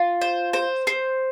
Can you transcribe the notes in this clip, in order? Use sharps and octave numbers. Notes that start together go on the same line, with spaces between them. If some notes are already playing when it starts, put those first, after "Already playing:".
Already playing: F4
C5
C5
C5